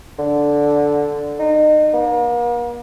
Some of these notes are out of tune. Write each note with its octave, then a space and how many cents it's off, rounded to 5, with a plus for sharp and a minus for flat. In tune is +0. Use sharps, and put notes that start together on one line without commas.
D3 -5
D#4 -30
A#3 +45